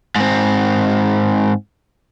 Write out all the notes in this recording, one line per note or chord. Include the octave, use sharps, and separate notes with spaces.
G#2 C4